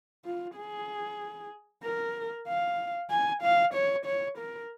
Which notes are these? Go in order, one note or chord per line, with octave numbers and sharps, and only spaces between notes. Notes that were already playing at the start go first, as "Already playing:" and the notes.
F4
G#4
A#4
F5
G#5
F5
C#5
C#5
A#4